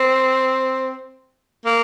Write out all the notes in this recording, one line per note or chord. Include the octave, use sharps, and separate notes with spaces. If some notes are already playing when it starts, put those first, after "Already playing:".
Already playing: C4
A#3